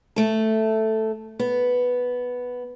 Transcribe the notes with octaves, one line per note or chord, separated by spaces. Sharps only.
A3 A4
B3